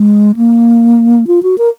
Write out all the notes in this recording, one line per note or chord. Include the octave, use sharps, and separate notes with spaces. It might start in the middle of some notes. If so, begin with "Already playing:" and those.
Already playing: G#3
A#3
F4
F#4
A#4